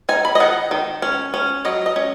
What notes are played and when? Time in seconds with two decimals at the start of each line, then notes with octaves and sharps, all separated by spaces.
0.09 D#4 G#5
0.25 B5
0.35 D#5
0.40 D#3 F#5
0.71 D#3
1.02 C#4
1.34 C#4
1.65 F#3 D#5
1.86 D#5
1.96 C#4